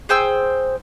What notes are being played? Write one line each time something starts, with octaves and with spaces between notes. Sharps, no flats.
G#4 C5 G5 E6